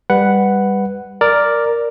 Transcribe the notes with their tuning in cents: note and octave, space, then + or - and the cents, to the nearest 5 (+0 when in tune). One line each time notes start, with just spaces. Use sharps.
G3 +15 B4 +0 F#5 +0
A#4 +0 D5 +0